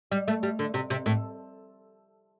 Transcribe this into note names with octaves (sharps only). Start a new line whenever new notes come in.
G3
A3
G3
D3
C3
C3
A2